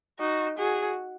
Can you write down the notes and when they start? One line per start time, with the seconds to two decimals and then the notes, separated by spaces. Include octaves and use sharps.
0.20 D#4 F#4
0.58 F#4 G#4